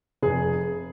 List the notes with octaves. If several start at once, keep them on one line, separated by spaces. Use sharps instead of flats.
F1 G#4